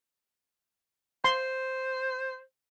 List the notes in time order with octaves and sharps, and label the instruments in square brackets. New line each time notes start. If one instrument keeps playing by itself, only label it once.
[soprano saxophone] C5 [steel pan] C6